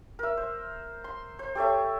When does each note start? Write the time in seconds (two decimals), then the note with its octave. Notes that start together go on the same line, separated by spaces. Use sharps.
0.19 A#4 E5
0.37 C5
1.04 C6
1.39 C5
1.55 G4 A4 C#5 E5